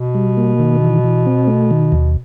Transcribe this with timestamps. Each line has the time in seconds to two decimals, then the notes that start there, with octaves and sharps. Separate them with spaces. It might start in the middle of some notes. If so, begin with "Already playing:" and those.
Already playing: B2
0.15 G3
0.37 A#3
0.60 D#3
0.82 E3
1.04 E3
1.26 C4
1.47 A3
1.71 D#3
1.92 D#2